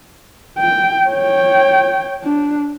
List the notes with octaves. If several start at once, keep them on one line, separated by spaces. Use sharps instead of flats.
G5
C#5 G5
D4